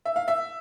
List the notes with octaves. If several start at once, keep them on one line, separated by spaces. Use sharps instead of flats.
E5
F5
E5